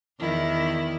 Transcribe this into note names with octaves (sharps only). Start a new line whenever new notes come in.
E2 D#3 E4